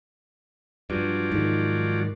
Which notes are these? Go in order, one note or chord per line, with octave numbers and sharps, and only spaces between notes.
G2 F3 F#3 D5
G#2 D#3